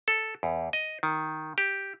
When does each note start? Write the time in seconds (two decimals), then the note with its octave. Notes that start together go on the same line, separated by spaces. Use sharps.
0.08 A4
0.43 E2
0.73 D#5
1.03 D#3
1.58 G4